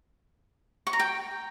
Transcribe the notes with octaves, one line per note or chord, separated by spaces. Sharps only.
C#6
A#5
G5